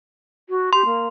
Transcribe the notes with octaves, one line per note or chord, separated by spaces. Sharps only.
F#4
G4 C6
A#3